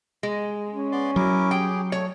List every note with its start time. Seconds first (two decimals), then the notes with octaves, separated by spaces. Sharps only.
0.23 G#3
0.72 C#4
0.92 B3 D5 C6
1.16 F#3 E4 A#4 D6
1.51 G4 G#4 G5
1.92 A3 C#5